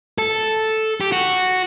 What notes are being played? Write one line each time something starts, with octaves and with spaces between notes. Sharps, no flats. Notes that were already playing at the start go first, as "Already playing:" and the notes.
A4
G4
F#4